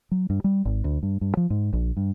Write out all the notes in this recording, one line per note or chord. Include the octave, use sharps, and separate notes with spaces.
F#3
G2
G3
G#1
D2
G2
G2
F3
G#2
A#1
G2